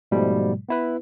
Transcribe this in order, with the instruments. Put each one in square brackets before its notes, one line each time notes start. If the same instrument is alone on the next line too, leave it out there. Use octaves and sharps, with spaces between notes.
[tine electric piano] G#2 B2 F3 G3 A3
B3 E4 B4